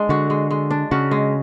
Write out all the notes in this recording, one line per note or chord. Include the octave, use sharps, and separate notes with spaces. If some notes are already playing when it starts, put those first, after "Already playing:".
Already playing: G#3 D4
D3 F#4
G#3
G#3
D4
C#3 F#4
G#3